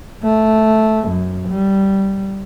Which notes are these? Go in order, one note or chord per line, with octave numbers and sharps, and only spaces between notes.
A3
F#2
G3